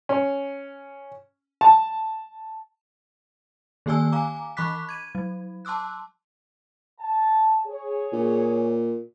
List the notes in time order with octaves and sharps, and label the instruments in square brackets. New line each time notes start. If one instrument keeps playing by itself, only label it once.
[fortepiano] C#4
A5
[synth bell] D#3 A#3 G4 D5 G#5 E6
F5 G#5 A#5 D6
E3 B5 C#6 D6 F#6 B6
G#6 D#7
F#3
A5 C6 D6 E6 F#6
[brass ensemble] A5
G#4 C#5
[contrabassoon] A#2